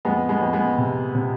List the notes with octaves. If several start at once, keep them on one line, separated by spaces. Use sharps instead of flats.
F2 G#3 B3
G#3 B3
F2
G#3 B3
C3
C3